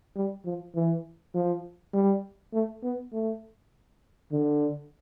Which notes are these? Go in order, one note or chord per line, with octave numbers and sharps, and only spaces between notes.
G3
F3
E3
F3
G3
A3
B3
A3
D3